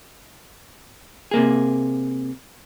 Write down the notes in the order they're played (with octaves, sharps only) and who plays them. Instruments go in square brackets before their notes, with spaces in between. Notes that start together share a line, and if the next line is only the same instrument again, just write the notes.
[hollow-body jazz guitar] C3 A#3 G#4